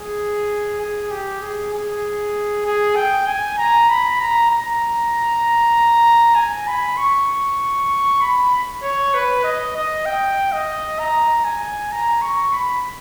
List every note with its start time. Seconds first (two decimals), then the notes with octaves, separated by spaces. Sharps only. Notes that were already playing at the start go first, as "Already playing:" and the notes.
Already playing: G#4
0.80 G#4
1.11 G4
1.42 G#4
1.73 G#4
2.66 G#4
2.96 G5
3.27 G#5
3.58 A#5
3.89 B5
4.20 A#5
4.50 A#5
6.35 G#5
6.67 B5
6.97 C#6
8.21 B5
8.83 C#5
9.14 B4
9.44 D#5
9.76 D#5
10.06 G5
10.52 D#5
10.99 A#5
11.45 G#5
11.92 A#5
12.22 C#6
12.53 B5